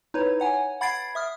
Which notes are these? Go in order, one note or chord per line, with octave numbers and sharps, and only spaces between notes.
D#4 E4 B4 C#5
C#5 F#5 G#5
F#5 B5 G#6 A6 C7 D7
E5 D#6 F6